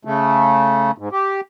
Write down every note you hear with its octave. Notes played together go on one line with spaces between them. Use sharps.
C#3 A3
G#2
G4